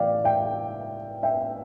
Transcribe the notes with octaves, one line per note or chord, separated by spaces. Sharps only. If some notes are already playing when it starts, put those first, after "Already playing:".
Already playing: A2 E3 D5 F5 G5
E5 G5
E5 G5